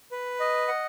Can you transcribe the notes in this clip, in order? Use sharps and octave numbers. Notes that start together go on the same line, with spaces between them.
B4
D#5
F#5